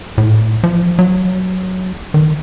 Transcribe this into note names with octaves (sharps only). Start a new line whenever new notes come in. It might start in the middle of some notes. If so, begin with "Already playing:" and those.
A2
F3
F#3
D#3